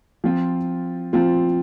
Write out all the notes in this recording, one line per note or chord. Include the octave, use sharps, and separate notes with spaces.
F3 C4 F4
F3 C4 F4